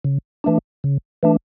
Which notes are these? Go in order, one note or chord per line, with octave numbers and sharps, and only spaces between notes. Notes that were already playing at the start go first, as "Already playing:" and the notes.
C#3
E3 A3 D4
C#3
E3 A3 D4